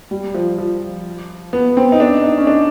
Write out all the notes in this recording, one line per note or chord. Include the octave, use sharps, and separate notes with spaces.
G3
F3
F3
B3
C4
D#4
D4
D#4
C#4
D4